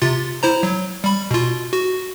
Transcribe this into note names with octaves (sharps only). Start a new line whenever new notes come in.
C3 F4 A6
E4 C5 A#5
F#3
G3 B5
B2 F4
F#4